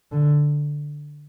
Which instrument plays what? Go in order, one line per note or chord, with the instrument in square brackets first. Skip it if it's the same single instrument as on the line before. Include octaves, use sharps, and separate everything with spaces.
[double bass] D3